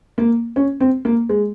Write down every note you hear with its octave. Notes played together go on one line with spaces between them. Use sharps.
A#3
C#4
C4
A#3
G#3